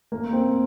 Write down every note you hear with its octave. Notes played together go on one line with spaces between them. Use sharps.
A#3
C4